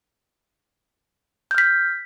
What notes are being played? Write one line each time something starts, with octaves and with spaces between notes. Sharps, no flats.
F6 G6 B6